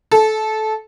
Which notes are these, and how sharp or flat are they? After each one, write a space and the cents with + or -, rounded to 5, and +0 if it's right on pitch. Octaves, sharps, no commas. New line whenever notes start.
A4 -20